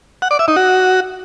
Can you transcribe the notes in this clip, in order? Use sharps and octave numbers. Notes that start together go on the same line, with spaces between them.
F#5
D5
E5
D#4
F#4